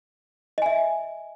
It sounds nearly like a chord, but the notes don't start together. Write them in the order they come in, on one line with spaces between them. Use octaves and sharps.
D#5 G#5 E5